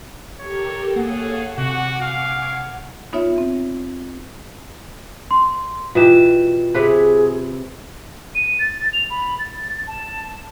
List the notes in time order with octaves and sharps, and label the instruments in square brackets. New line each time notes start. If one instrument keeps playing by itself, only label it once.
[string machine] G4 A4 A#4 [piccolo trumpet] C#5
[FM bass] A#3 [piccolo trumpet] G#4 [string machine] A4 C#5 F5 [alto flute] F#5
[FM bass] C3 [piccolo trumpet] F#4 [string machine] G#5 C#6 D6
[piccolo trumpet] F5
[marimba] B3 D#4 F4 C#5 E5
C4
[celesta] C6
[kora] B2 E3 G4 [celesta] F4 E7
[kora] C3 B4 [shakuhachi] G#4
[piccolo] D#7
A6
F7
B5
A6
A5